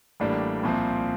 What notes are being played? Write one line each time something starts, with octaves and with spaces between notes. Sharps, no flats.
A1 A2 G3 A#3 D4
C2 A#2 F3 C4